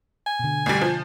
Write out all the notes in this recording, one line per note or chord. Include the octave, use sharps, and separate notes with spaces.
G#5
B2 D3
A1 G3
F3